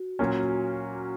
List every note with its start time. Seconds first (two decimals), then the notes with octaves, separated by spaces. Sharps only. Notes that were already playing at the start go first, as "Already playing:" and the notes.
Already playing: F#4
0.19 A#2 F#3 A#3 C#4